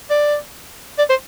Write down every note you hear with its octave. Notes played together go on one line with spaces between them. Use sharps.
D5
D5
C5